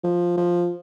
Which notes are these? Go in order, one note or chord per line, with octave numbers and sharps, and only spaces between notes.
F3
F3